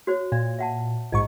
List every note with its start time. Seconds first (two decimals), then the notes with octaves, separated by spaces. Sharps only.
0.07 F#4 C5 C#5
0.32 A#2 D5
0.59 E5 F#5 A5
1.12 A#1 G#2 D#5 C#6